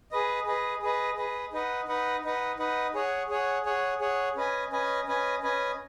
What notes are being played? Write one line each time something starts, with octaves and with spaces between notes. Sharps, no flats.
G#4 B4 D#5
G#4 B4 D#5
G#4 B4 D#5
G#4 B4 D#5
D#4 B4 D#5 F#5
D#4 B4 D#5 F#5
D#4 B4 D#5 F#5
D#4 B4 D#5 F#5
G#4 C#5 F#5
G#4 C#5 F#5
G#4 C#5 F#5
G#4 C#5 F#5
C#4 B4 D#5 G#5
C#4 B4 D#5 G#5
C#4 B4 D#5 G#5
C#4 B4 D#5 G#5